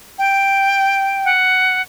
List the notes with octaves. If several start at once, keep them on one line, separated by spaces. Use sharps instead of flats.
G5
F#5